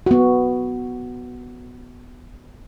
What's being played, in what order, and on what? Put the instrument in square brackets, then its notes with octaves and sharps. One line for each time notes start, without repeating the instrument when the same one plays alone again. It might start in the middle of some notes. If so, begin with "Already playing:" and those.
[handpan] B3 F#4